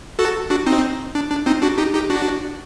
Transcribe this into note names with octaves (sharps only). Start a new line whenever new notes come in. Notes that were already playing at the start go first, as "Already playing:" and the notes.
F#4 A4
D4 F#4
C4 D#4
D4
D4
C4 D#4
D4 F#4
D#4 G4
D#4 G4
D4 F#4